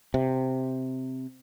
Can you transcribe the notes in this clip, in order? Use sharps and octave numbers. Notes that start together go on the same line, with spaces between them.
C3